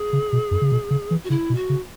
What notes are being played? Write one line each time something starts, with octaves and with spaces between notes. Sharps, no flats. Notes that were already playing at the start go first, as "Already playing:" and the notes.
Already playing: G#4
C#3
B2
F#2
C#3
B2
C#3
E3
F#4
C#3 E4
B2
F#4
C#3